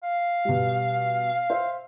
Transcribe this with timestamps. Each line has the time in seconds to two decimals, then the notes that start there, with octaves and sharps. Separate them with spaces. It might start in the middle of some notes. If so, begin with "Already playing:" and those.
0.03 F5
0.45 B2 G3
1.50 C5 E5